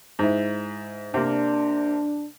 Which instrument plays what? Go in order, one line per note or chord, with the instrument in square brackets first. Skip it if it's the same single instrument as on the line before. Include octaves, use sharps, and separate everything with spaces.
[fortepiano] G#2 E4
[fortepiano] C3 A#3 [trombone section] D4